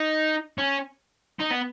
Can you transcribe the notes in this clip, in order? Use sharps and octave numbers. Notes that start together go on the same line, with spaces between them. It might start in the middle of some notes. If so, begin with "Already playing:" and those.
Already playing: D#4
C#4
D#4
B3